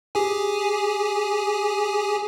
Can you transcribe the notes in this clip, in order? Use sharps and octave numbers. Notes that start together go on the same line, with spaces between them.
G4 G#4 G#5